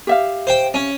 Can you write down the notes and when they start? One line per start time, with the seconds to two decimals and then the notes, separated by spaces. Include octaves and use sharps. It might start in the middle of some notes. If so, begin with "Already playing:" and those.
0.07 G4 E5 F5
0.47 C5 G5
0.74 C#4